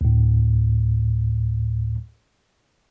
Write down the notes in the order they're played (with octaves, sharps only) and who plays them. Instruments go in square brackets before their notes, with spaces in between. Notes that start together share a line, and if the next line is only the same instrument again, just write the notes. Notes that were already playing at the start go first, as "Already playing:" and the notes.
[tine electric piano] D2 A2